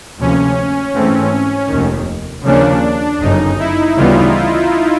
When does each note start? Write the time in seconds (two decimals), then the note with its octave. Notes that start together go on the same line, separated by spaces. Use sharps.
0.21 D2 C3 F3 A#3 C#4
0.96 G#2 E3 A3 C4
1.71 F1 D#2 D#3
2.46 D#2 C#3 F3 A#3 C#4 D4
3.21 G1 F#2 C#3 D#4
3.60 E4
3.97 D2 C#3 E3 G3 B3 F4